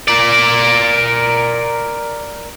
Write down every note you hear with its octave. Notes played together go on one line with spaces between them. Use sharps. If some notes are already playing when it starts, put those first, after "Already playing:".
A#4 D5